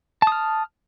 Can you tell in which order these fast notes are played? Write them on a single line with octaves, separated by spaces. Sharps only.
A5 D#6 F6